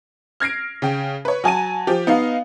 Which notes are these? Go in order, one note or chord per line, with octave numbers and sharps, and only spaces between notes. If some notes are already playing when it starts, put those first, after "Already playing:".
F6 G#6 A#6 C7 D7
C#3 G5
B4 C#5
F#3 G#5 A5 D#7
F3 G4
B3 D#4 D#5 F5